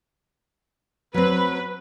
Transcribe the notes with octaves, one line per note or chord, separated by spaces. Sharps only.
F#3 C4 B4